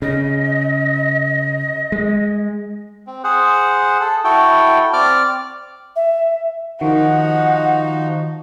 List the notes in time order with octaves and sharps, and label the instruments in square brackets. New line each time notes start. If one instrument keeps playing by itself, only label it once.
[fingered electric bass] C#3 [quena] D#5
[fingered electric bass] G#3
[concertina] C4
G#4 C5 F#5
A4
E4 F#4 A4 G5
C4 D5 D6 F6
[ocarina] E5
[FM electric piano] D#3 [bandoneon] F3 F#4 [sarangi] D#4 [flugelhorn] F#5